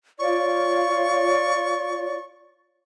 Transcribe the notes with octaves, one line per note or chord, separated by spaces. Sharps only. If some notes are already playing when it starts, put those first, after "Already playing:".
F4 C#5 D5 C#6